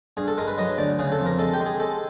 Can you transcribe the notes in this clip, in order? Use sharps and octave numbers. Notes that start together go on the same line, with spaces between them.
G2 G#4
A4
G#3 A#4
B4
F#3 D#5
D2 D5
C#3 G#4
A4
F2
A#4
G#3 A4
G4
G#3
G#4
G#3 A4